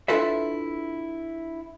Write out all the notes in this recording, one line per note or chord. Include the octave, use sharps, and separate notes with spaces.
D4 E4 F4 A4 B4 E5